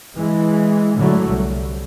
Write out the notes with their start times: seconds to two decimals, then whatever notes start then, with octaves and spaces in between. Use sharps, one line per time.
0.16 E3 G#3
0.95 A2 D3 F#3 A3
1.29 C2